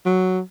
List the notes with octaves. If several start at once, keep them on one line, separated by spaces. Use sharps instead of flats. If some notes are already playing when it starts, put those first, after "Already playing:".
F#3